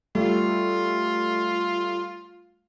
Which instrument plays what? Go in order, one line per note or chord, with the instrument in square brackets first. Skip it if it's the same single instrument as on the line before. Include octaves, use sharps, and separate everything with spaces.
[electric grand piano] G3 A3 [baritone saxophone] F4